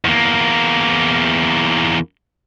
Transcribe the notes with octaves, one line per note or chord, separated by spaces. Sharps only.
E2 A#3